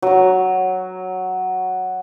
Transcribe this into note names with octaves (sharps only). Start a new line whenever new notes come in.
F#3 C#5